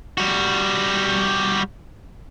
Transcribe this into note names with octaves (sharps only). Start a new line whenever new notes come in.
G3 F#4